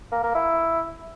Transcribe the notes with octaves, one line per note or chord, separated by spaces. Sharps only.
A#3
A#3
E4